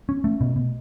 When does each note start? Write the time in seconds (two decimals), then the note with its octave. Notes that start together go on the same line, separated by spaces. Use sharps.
0.09 C#4
0.24 A3
0.41 B2
0.56 B2